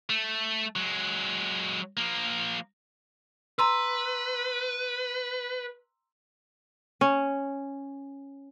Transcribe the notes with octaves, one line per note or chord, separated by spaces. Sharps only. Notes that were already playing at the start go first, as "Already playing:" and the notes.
A3
F#3 G#3
F3 A#3
B4 A#5 C6 E6
C#4